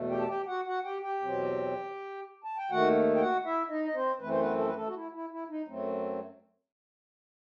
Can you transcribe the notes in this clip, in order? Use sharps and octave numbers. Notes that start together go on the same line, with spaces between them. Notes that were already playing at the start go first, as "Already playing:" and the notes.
Already playing: E2 B2 A3
G4 G5
A5
G4 G5
F#4 F#5
F#4 F#5
G4 G5
G4 G5
E2 B2 F#3 C4
A5
G5
D#2 D#3 A3 F#4 F#5
G5
F#4 F#5
E4 E5
D#4 D#5
D#5
C4 C5
F#2 E3 A3 C4 B4
C5
B3 B4
A4
B4
A3 A4
F#4
E4
E4
E4
D#4
F#2 F#3 A3 C4